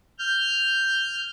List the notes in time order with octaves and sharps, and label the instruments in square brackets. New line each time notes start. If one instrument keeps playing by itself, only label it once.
[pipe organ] F6 G6